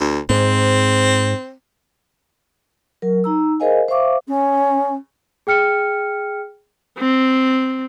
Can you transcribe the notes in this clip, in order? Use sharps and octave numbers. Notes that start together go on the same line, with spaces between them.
D2
G#2 C4
F#3 A#4
D#4 A#5 E6
G#4 A#4 C5 D#5 F5 G#5
C5 E5 F5 C#6 D6
C#4
G#4 G5 F6 C#7
C4